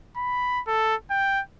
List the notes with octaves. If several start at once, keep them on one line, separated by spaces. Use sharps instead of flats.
B5
A4
G5